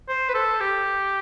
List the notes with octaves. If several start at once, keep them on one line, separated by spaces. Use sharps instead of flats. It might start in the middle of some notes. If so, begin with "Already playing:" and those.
C5
B4
A4
G4